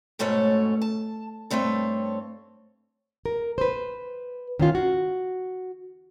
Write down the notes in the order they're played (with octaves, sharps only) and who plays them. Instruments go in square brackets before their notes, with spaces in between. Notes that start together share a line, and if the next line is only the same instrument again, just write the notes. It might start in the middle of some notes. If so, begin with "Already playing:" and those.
[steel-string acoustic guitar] G#2 B2 A3 C#4 A4 C#5
A5
G2 A3 C4 A4 C#5
[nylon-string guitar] A#4
B4 C5
D#3 C#4 F4
F#4